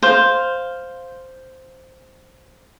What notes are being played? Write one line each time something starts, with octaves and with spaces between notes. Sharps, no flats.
C5 F5